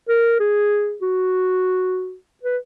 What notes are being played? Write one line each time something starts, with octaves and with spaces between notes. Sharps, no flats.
A#4
G#4
F#4
B4